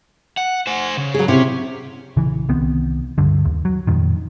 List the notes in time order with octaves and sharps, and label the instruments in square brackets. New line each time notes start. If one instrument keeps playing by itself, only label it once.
[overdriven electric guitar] F#5
C5 G#5
C#3
[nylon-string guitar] F#3 G#4
[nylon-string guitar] C3 E4 [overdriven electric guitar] C#4
[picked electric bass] A#1 C#3 E3
C2 D#3 B3 C4
C#2 G2 D3
D#2
F#3
F2 A#2 D#3